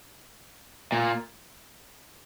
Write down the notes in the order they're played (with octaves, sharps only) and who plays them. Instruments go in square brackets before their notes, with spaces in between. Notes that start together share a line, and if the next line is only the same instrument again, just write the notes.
[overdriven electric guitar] A#2